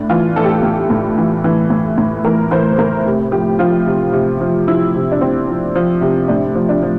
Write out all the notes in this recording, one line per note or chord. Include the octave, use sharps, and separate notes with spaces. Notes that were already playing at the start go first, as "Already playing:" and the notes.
Already playing: A2 D4
E3 F4
E3 A4
G4
A4
A2
A2
E3
E3
A2
A2
E3 A#4
E3 C5
A2 A#4
C3
F3 G4
F3 F4
C3
C3
F3
F3 E4
C3
D4
C3 C4
F3
F3
C3
A2 D4
F3
D4
F3